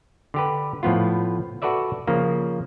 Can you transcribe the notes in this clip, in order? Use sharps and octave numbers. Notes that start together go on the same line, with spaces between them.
D3 G4 B4
A2 F3 B3 F4
F#4 A4 B4 D5 E5
C#3 F3 A#3